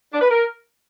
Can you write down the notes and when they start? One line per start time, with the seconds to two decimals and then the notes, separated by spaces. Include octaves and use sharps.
0.12 D4
0.21 B4
0.29 A#4